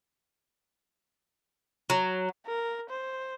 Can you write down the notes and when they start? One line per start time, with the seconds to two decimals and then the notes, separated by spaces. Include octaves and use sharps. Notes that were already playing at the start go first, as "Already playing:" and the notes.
1.90 F#3
2.47 A#4
2.90 C5